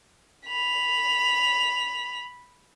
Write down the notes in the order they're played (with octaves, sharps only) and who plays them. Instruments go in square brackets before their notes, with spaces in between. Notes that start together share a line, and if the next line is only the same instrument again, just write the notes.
[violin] B5 F7